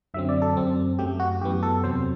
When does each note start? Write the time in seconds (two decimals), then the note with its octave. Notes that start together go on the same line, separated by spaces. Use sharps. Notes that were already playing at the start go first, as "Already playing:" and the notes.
0.14 F#2 D3 F#3 C4 E5
0.29 D5
0.42 A4
0.56 F#2 F#3 C4
0.99 F#2 F#3 A3 G4
1.20 F#4
1.41 F#2 G4
1.44 E3 B3
1.63 A4
1.84 E2 C3 F#3 C4 C5